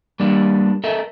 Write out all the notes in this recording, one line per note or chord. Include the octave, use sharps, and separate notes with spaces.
G3 A#3 D4
A4 A#4 D#5 E5